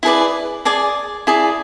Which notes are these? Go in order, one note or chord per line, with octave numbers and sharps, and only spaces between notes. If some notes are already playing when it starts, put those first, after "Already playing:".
E4 G#4 B4 D5
G#4 D5 G#5
E4 G#4 D5